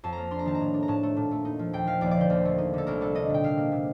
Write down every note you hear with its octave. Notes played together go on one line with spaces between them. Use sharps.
F2 A5
A#3 A#5
D4 C6
A#5
D#3 A5
A#5
A2
D4
A#5
A2 A5
A3
A#2
A3
D#4
F3
D#2 G5
F3 F5
D#2 D5
D5
D3 C5
D#2
A3
D#4
D3 A4
C2 A#4
G3 A4
D4 D#5
A#2 G5
C3 F5
A#3
C3